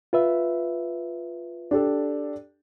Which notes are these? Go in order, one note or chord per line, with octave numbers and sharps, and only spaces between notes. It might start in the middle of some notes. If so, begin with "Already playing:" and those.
F4 B4 E5
D4 G4 A4